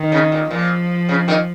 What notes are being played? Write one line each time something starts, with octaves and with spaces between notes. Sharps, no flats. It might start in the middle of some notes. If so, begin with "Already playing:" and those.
Already playing: D#3
C#3
A#2
A#2 F3
C#3
A#2 D#3